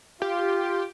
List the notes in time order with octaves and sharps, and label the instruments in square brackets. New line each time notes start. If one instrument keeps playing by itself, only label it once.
[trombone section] F4 [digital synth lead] G4